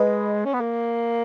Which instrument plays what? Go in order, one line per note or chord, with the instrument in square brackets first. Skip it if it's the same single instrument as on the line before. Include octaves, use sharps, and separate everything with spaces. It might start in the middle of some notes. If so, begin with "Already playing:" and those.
Already playing: [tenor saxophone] G#3 [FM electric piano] B4 D#5
[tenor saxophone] C#4
B3
A#3